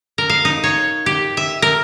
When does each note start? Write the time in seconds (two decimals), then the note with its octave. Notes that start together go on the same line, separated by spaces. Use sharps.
0.18 A#4
0.30 F5
0.45 D#4
0.64 C#5
1.06 G4
1.37 E5
1.62 A#4